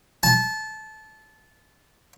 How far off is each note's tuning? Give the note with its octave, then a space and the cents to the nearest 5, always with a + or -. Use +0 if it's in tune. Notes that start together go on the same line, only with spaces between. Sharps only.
A5 -20